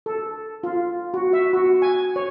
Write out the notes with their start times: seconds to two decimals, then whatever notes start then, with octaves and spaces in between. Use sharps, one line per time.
0.06 A4
0.64 F4
1.14 F#4
1.33 E5
1.53 F#4
1.82 G#5
2.16 C#5